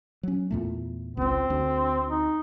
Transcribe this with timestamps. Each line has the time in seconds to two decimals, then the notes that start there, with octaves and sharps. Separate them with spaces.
0.23 F#3 C#4
0.51 E2 A#2 A3
1.17 G#1 C#2 C4
1.50 D2
2.10 D#4